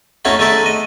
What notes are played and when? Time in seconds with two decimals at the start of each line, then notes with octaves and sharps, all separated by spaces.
0.25 A3 C#4 D#4 E4 F#4 A4
0.39 G#3 A3 D#4 A4 D5 E5
0.66 D#5